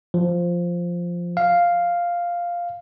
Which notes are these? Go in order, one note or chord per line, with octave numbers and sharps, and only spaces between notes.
F3
F5